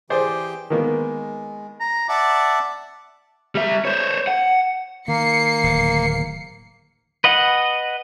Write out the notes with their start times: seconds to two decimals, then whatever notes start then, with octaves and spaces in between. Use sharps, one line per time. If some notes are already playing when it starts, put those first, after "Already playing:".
0.10 E3 G4 G#4 C5 D5 G5
0.70 D#3 G#3 A#3 B3
1.80 A#5
2.09 D5 E5 F#5 A5
3.55 G3 E5
3.85 C5 C#5
4.27 F#5
5.08 D#3 A#3 C7 C#7
5.63 D1 D#3
7.24 B4 D#5 F#5